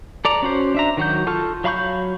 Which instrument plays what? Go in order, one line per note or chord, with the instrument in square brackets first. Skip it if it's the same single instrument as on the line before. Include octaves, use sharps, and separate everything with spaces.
[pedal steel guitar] A4 D5 A#5
C#4 F#4 C5
D4 E5 A#5
D#3 F#3 F#4 F#5 G6
F4 A4 A5 C#6 F6
F#3 F5 B5 C#6 G6